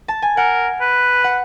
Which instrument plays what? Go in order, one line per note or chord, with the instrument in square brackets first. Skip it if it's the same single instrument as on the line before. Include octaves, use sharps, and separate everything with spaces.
[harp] A5
G#5
[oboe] A#4 [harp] F#5
[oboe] B4
[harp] F#5